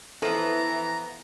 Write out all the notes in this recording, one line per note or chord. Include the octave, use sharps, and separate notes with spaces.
E3 F3 B3 A4 A#5